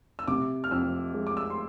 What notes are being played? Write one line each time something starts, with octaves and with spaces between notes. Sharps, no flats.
E6
C3 D6
F6
F2 E6
G#3
D6
E6
C6